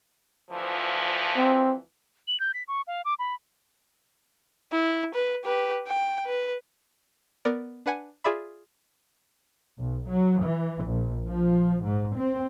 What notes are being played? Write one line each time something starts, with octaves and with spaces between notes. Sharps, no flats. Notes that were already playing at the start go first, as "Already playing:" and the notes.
D2 E3 F3
C4
F#7
G6
B6
C#6
F5
D6
B5
E4
B4
G4 B4
G5
B4
B3 A#4 D5
D4 B4 F#5 G#5
F4 G#4 D5 E5 B5
B1
F#3
E3
A#1
F3
G#2
C4